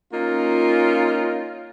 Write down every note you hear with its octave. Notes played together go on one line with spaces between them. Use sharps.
A#3 C#4 D#4 F4